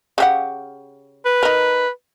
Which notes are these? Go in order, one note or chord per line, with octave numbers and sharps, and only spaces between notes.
C#3 G4 F#5
B4
D#4 A#4